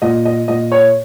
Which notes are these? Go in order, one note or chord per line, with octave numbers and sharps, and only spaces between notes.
A#2 D#5
D#5
A#2 D#5
C#5